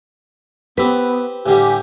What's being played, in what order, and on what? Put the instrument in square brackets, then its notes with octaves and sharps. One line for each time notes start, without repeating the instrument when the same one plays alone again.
[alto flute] B3 [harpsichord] C4 G4 [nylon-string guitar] B4
[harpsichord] A2 D3 G3 [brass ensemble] G4 [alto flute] G#5